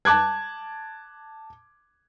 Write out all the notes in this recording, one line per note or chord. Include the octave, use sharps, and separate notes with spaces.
A5 D6 F#6 G#6